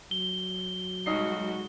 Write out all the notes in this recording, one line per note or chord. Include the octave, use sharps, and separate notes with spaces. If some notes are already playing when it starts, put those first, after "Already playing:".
F#3 G7
B1 G3 G#3 D#4 F#4 C7